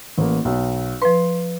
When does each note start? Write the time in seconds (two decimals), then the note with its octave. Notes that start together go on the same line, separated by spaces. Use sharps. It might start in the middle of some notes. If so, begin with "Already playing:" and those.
0.18 A1 A#3
0.45 B1
1.02 F3 B4 C6